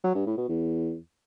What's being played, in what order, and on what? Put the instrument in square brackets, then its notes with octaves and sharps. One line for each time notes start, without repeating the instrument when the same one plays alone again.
[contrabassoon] F#3
G2
A2
B2
E2